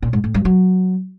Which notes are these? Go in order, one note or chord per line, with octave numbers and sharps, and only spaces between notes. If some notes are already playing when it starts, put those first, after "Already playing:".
A#2
G#2
A2
G2
F#3